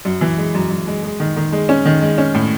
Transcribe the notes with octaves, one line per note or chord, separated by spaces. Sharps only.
F#2
E3
G#3
F#2
F#2
G#3
G#3
D#3
D#3
G#3
C#4
D#3
G#3
C#4
A2